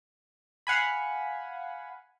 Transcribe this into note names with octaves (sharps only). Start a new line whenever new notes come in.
F5 F#5 G#5 B5